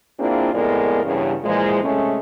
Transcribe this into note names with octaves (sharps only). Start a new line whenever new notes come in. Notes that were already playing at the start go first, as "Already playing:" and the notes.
A#3 C4 D4 E4 F4 G#4
F2 A2 G#3 B3 A#4 D5
E2 G2 C#3
A#2 E3 F3 G#3
C3 G#3 A3 C#4